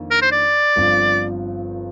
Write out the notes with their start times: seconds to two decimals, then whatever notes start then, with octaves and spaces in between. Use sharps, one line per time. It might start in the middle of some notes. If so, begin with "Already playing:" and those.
Already playing: F2 D#3 A#3 D4
0.11 A#4
0.22 C5
0.32 D5
0.76 G1 G2 F3 C4